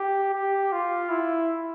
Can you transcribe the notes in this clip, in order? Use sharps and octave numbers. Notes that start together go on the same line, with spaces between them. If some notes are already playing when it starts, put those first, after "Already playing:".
Already playing: G4
G4
F4
E4